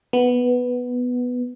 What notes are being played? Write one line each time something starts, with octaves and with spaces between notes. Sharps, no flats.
B3